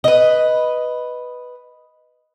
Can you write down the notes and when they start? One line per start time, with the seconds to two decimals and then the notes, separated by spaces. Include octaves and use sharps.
0.04 B4 D#5